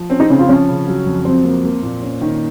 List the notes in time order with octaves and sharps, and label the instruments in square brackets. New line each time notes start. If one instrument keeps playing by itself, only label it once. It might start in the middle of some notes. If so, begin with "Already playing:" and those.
Already playing: [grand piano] F3
[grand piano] C4 [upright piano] C#4
[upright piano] D#4
[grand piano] C#3 [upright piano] C#4
[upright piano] F4
[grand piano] F3 [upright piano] C#4
[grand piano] C#3
F#3
F2
[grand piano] F3 [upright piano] C4
[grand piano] A#3
A#3
A#2
C#4
D#3